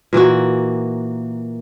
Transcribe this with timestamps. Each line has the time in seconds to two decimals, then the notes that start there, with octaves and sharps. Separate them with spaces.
0.13 A#2 E3 A#3 F#4